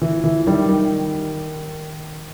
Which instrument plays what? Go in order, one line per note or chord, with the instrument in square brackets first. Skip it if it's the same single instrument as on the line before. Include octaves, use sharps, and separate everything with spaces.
[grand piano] E3
E3
D#3 G3
D#3